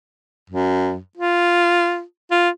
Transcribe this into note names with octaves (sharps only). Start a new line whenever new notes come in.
F#2
F4
F4